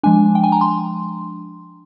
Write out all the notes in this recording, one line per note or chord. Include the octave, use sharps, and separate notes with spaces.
F3 G#3 D4 G#5
G5
G#5
A#5
C6